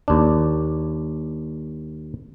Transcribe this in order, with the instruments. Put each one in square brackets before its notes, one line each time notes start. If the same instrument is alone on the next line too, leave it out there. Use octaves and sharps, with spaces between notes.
[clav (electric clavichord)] D#2 D4